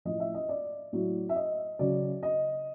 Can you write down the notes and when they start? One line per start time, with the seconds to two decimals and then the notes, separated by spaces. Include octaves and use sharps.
0.05 A2 F3 D#5
0.20 E5
0.34 D#5
0.49 D5
0.92 A2 F#3
1.29 E5
1.36 D#5
1.79 C#3 F#3 D5
2.23 D#5